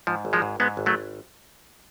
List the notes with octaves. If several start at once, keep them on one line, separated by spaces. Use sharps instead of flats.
G#2 F3
G#1
F3 G#3
G#2
G#2 G#3 B3
G#1
F#3 A3